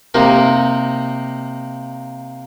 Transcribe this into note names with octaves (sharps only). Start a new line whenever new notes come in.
C3 A#3 D#4 A#4 C6